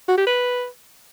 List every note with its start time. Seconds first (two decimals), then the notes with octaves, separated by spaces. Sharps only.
0.08 F#4
0.17 G4
0.27 B4